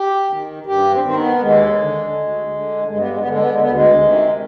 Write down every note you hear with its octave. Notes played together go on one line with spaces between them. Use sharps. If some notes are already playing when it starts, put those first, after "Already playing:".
Already playing: G4
D#3
G2 G4
C4
D#3 C4
B3
D#2 G#3
D3
D2
D3
G2 G#3
B3
G#3
B3
D3 G#3
B3
G#3
D2 B3
G#3
C3 D#3